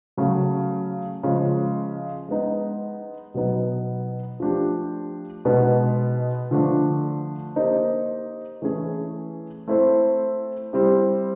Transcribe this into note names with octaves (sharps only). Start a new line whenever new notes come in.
C#3 F#3 A3
C#3 F3 G#3
G#3 B3 D#4
B2 F#3 B3 D#4
F3 A3 D4 G4
B2 G#3 B3 D#4
D3 F3 A3 D4
A#3 D#4 G4 C5
E3 A3 C#4 E4 G#4
A3 C4 E4 A4 C5
G3 C4 E4 G4